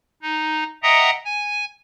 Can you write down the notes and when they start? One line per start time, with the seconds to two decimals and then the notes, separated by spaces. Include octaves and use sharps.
0.22 D#4
0.83 D#5 E5 F#5 G5 A#5 D#6
1.25 G#5